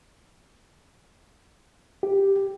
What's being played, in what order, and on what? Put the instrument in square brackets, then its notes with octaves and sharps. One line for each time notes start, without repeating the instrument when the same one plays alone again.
[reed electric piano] G4